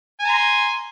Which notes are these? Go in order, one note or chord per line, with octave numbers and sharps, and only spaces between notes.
G#5 A#5 C6